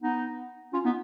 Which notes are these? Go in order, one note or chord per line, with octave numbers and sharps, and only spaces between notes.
B3 D#4
C#4 F4
B3 D#4